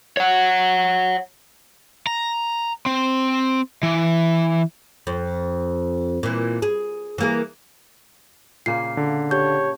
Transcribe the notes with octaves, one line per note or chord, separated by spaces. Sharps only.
C#5 F#5
A#5
C4
E3
F2
A#2 E3
G#4
E3 A#3 G#4
A#2 C#3 A#3 C7
D3
G4 C#5 A5 G6